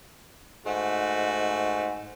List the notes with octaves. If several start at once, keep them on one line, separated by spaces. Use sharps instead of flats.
G#2 A3 F#4